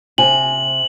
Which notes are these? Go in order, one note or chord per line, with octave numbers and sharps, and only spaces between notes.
C3 G#5 F#7